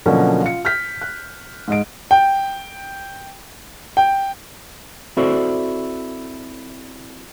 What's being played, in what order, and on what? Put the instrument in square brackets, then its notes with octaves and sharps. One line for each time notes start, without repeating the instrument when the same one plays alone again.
[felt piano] B2 D3 F3 F#3 A#3 C#4
F4 C#7
F6 G6 B6
F#6
G#2 D#5 D7
[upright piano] G5
G5
[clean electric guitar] C4 E4 F#4 A4 C5 D5